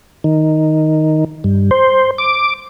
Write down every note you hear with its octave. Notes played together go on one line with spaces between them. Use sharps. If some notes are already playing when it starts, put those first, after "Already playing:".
D#3
G2
C5
D6